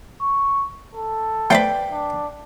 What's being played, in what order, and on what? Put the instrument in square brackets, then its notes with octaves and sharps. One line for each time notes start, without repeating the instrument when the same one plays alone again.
[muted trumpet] C#6
A4
[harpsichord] A3 C4 [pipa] B4 D5 G5
[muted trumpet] D4